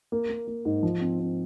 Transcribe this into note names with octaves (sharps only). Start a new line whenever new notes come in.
A#3
A#3
A#3
G#2
F3
C4
C4